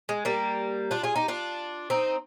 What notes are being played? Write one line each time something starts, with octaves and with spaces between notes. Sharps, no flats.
G#3
G3 A#3
D4 F4
F4 G#4
D#4 G4
D4 F4
C4 D#4